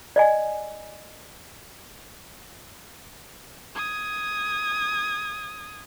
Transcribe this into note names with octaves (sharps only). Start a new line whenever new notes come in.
D5 D#5 G#5
D#6 G#6